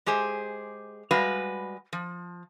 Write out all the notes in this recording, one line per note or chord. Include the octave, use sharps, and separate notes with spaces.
G#3 G4 G#4 C5
G3 G#3 F#4 B4 F5
F3